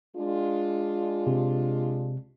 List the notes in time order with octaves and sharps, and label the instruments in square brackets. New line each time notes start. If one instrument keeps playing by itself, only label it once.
[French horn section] G#3 D4 F4
[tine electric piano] C3